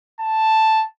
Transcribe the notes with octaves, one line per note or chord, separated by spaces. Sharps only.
A5